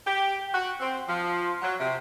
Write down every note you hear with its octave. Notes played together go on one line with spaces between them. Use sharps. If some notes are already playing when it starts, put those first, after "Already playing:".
G4
F#4
C4
F3
F#3
C3